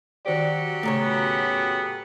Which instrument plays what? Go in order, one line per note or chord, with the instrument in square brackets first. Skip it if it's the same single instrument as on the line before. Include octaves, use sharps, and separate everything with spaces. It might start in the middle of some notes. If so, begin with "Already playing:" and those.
[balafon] D#3 C5 D5 [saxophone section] F#3 F#4 G4
[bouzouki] A2 C#3 C#5 [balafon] A3 A#5
[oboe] B3